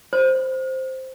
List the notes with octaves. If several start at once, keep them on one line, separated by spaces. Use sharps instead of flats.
C5